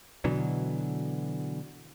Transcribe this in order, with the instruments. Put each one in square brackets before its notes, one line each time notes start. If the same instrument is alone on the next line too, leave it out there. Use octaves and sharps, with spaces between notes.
[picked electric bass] B2 D3 E3 F#3